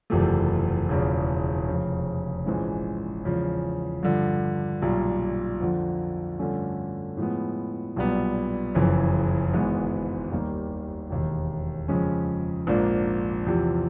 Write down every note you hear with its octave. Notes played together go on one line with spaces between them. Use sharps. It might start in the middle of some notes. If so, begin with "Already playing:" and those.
F#1 E2 C3 F3 A3
E1 E2 C#3 F3
F1 F2 C#3
A#1 G#2 E3 G#3 C#4
E2 C#3 F3 G#3
G2 D3 F3
B1 A#2 G3
F2 D3 F3
G2 D3 F3 A3 C#4
A2 F3 G#3 B3
B1 A#2 G3 B3
F#1 F2 C#3 E3
G#1 G#2 E3 G#3 B3
D#2 D#3 G3 A#3
E1 D#2 D#3
F2 C#3 F3 G#3 C#4
A#1 G#2 F3 A#3 D4
E2 C3 F3